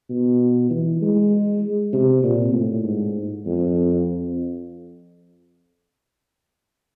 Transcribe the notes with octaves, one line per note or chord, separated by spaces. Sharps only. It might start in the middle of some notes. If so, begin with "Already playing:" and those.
B2
E3
G#3
C3
A#2
A2
G#2
F2